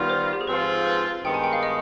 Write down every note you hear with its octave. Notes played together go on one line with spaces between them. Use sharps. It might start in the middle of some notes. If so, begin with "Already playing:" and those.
Already playing: D#3 G3 B3 F4
C5
G4
G#4
G#2 F3 C4 F4 B4
G#4
B4
G2 D#3 G#3 B3 D#4 G5
G#5
G5
F5
D#5